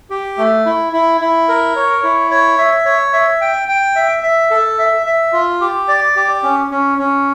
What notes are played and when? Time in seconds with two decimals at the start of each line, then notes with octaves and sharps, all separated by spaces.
0.10 G4
0.38 A3
0.66 E4
0.93 E4
1.21 E4
1.49 A#4
1.76 C#5
2.03 E4
2.31 C#5
2.58 E5
2.85 C#5
3.13 E5
3.41 G5
3.68 G5
3.96 E5
4.23 E5
4.51 A4
4.79 E5
5.06 E5
5.33 F4
5.61 G4
5.88 D5
6.16 G4
6.43 C#4
6.71 C#4
6.98 C#4